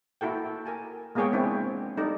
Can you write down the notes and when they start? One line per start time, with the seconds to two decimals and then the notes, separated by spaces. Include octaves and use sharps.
0.21 A#3 E4 F#4 A4 G5
0.65 A#4 G#5 A5
1.15 G#3 A#3 B3 G#4 C#5 G5
1.33 C4 D4 E4
1.97 G3 D#4 A4 D5